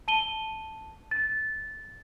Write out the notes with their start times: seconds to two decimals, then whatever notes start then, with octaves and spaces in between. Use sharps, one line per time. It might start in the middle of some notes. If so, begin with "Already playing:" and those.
0.08 A5 D#7 G7
1.11 A6